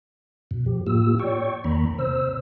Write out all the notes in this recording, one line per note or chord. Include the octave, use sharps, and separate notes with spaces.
F#2 B2
F3 G4
A2 A#3 F4 G4 E6
C#5 D5 G5 C#6
E2 D#3 A#3 A#5 B5
C3 C5 E6